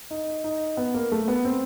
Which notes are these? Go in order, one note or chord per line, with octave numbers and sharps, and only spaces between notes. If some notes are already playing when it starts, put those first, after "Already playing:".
D#4
D#4
B3
A#3
A3
B3
C4